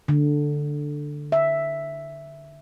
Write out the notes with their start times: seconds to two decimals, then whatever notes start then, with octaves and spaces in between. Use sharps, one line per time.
0.08 D3
1.32 E5